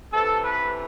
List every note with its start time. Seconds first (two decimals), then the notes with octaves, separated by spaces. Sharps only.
0.12 C3 E3 A4
0.43 B4